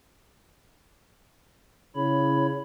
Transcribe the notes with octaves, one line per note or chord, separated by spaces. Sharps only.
C#3 E4 C#5 B5